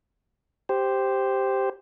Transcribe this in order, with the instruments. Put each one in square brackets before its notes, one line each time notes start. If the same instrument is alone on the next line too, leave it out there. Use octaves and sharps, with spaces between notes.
[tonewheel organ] G4 C5